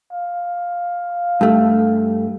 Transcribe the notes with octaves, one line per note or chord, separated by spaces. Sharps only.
F5
G2 A3